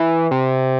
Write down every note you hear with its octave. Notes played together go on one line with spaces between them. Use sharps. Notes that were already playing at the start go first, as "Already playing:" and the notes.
Already playing: E3
C3